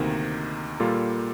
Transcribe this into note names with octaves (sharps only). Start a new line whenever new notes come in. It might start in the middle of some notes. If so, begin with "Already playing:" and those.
Already playing: D2 C3 D#3 A#3 D#4
A#2 G3 A#3 F4 A4